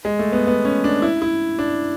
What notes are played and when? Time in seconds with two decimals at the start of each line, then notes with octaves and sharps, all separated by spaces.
0.05 G#3
0.19 A3
0.32 B3
0.47 B3
0.65 C#4
0.84 D4
1.02 E4
1.22 E4
1.59 D4